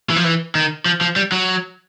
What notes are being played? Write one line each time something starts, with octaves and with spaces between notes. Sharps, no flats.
E3
F3
E3
D#3
F3
F3
G3
F#3